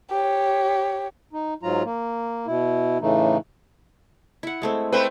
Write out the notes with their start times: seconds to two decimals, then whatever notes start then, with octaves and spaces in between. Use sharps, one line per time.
0.11 G4 C#5
1.33 D#4
1.63 G#2 F#3 F4 A#5
1.85 A#3
2.47 B2 E4
3.01 A2 C#3 E3 A3 D#4
4.43 E4 F#5
4.62 G#3 A3 C4
4.92 A3 C4 B4 C5 E5